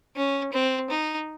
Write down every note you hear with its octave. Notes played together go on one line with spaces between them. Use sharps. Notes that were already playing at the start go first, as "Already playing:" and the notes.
C#4
C4
D#4